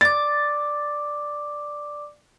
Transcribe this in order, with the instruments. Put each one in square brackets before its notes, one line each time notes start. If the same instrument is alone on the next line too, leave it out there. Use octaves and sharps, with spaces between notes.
[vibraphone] D5 D6 [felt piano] A6